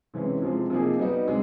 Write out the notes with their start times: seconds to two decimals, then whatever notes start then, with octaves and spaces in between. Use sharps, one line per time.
0.14 C3 E3 G#3 C#4
0.42 C3 F3 G#3
0.70 C3 F3 A#3 D#4 G#4
0.99 G3 B3 D#4 F#4
1.27 C3 G#3